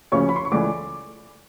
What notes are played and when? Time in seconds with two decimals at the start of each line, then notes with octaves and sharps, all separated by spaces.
0.12 D2 C#3 F3 A#3 C#4 C#5 C#6
0.29 B5
0.36 C6
0.45 C#6
0.52 C#2 C#3 E3 A3 D5 D6